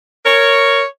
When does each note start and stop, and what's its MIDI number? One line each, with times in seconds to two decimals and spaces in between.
0.26 0.84 70
0.26 0.84 73